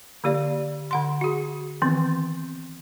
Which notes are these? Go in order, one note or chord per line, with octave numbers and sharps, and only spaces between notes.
D3 A#3 G4 D5 F5
D3 F#5 C6
F#4 G#4
D#3 E3 B3 C4